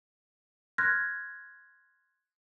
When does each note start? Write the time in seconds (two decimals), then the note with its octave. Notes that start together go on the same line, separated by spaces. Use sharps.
0.78 C6 F6 F#6 G#6 A#6